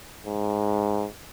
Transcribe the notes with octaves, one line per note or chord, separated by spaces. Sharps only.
G#2